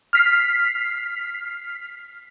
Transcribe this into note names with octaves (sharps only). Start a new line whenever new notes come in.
F6 B6 C7